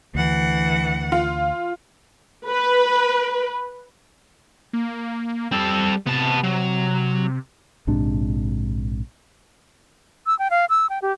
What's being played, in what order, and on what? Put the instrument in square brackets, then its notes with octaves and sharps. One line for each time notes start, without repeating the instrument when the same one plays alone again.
[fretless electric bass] D2 [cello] E3 F#5
[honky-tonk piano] F4
[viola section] B4
[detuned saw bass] A#3
[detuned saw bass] G3 [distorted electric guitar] C4 A4
[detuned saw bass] C3 [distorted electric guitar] B3 A5
[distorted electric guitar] F#3
[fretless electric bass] A#1 G#2 C3 D4
[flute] E6
G5
F5
E6
G5
G4